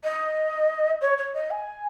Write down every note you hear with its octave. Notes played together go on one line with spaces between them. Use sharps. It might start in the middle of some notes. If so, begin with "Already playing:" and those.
D#5
C#5
C#5
D#5
G#5